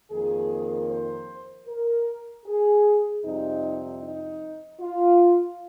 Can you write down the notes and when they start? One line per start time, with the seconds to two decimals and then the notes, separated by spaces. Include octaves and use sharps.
0.11 F2 D#3 A#3 G#4
0.89 C5
1.67 A#4
2.46 G#4
3.24 F2 C3 G3 C4 D#4
4.03 D#4
4.81 F4